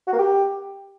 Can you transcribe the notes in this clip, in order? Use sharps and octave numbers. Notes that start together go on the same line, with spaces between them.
F#4
A#3
G4